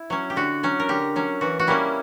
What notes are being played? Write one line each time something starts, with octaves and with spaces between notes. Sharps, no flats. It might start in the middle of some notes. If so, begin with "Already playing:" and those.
Already playing: E4
F#3 C#4
G4
D3 F#4
F#3 C#4
A#4
D3 G4
F#3 C#4
E3 F#4
F#4
G3 A#3 C#4 E4